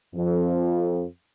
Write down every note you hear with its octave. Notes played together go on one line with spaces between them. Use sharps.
F2